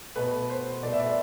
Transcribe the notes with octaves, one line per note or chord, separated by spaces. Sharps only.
B2 A3 B4
C5
B2 A3 D5
E5
D5